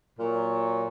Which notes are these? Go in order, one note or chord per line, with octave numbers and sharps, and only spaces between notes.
A#2 F#3